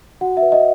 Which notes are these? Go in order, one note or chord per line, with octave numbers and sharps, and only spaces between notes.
F#4 F#5
E5
B4
D#5